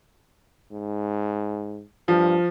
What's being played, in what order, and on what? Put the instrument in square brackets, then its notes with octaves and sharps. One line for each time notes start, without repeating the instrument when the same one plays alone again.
[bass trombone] G#2
[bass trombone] G2 [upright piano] F3